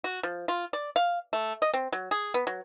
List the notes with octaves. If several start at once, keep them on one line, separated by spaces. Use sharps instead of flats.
F#4
F3
F4
D5
F5
A3
D#5
C4
F#3
G#4
B3
F#3